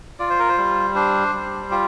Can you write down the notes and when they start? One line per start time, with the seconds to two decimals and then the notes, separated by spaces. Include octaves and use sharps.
0.19 F4 D5
0.30 C5
0.39 A#4
0.49 C5
0.58 G3
0.95 D4 C5
1.33 G3
1.71 F4 G4